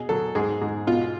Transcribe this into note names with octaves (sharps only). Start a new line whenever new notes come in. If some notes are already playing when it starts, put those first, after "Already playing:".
Already playing: B2 G#4
F#3 A4
G#2 G#4
G#2
B2 F4